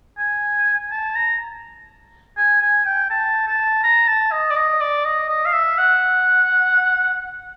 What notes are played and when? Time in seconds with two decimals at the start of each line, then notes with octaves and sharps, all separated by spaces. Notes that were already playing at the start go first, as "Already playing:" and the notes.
0.18 G#5
0.91 A5
1.16 A#5
2.37 G#5
2.62 G#5
2.86 G5
3.10 A5
3.47 A5
3.83 A#5
4.08 A5
4.32 D#5
4.50 D5
4.56 D#5
4.81 D5
5.05 D#5
5.29 D#5
5.46 F5
5.53 E5
5.78 F#5